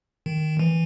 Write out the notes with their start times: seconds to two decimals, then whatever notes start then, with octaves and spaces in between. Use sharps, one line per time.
0.26 D#3
0.59 E3